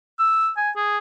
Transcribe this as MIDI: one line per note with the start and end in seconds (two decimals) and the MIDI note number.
0.19 0.50 88
0.57 0.71 80
0.76 0.98 68